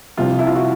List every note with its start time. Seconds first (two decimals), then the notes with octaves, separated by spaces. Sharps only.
0.17 C2 C3 F3 F4
0.39 E4
0.47 F4
0.55 F#4